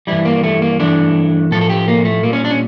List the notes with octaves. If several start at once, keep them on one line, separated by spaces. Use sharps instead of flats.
G2 E3 G3 E4
A#3
A3
A#3
G2 E3 A3 D4
A2 F3 A3 A4
A4
G4
A#3
A3
A#2 G3 A#3
C#4
D4
C#4